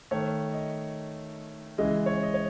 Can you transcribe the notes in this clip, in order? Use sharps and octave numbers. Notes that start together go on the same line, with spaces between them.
D#3 A3 C#5
D#5
C#3 E3 G#3 D#5
C#5
D#5
C#5